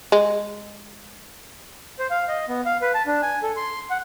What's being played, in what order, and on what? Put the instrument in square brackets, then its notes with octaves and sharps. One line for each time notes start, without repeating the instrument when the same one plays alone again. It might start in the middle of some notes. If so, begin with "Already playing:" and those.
[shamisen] G#3
[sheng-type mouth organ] C5
F5
D#5
B3
F5
B4
A5
D4
G#5
A4
C6
F#5